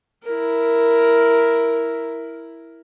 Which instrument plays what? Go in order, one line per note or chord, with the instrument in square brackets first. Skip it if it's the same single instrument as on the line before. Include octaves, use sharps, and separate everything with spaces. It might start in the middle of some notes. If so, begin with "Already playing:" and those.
[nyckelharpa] E4 A#4